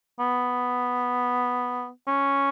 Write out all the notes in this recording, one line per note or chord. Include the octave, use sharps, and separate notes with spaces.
B3
C#4